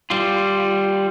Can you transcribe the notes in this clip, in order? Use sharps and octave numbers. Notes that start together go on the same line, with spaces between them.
G3 F4